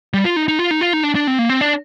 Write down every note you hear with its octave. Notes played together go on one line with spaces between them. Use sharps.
G3
F4
D#4
D#4
F4
D#4
F4
D#4
D4
D4
C4
A#3
C4
D4